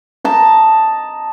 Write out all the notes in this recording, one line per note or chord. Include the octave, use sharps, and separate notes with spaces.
D#5 A5 A#5